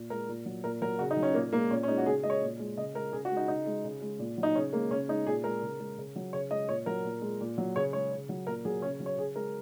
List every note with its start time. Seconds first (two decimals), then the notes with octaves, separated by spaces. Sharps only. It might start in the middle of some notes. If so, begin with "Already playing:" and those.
Already playing: A#2
0.10 G#3 A#4
0.29 A#2
0.46 F#3
0.64 A#2 A#4
0.82 F#3 A#4
0.99 C#3 F#4
1.11 D#4
1.17 F#3
1.23 C#4
1.34 A#2 A#3
1.53 G#3 A#3
1.71 A#2 C#4
1.83 C#4
1.88 G#3 D#4
1.98 F#4
2.06 C#3 G#4
2.23 G#3 D#5
2.30 C#5
2.42 A#2
2.59 G#3
2.77 C#3 D#5
2.95 G#3 A#4
3.13 C#3 G#4
3.25 F#4
3.31 G#3
3.37 D#4
3.48 C#3 D#4
3.66 G#3
3.84 C#3
4.02 G#3
4.19 A#2
4.38 F#3
4.43 D#4
4.55 C#3 C#4
4.73 G#3 A#3
4.91 C#3 C#4
5.09 G#3 D#4
5.26 A#2 G#4
5.44 G#3 A#4
5.62 C#3
5.80 G#3
5.98 C#3
6.16 F#3
6.33 C#3 C#5
6.51 G#3 D#5
6.69 A#2 C#5
6.86 F#3 A#4
7.04 A#2
7.22 G#3
7.40 A#2
7.58 F#3
7.76 C#3 C#5
7.93 G#3 C#5
8.11 C#3
8.29 F#3
8.47 A#2 A#4
8.65 F#3 G#4
8.82 C#3 C#4
9.00 F#3
9.06 C#5
9.17 C#3 G#4
9.36 G#3 A#4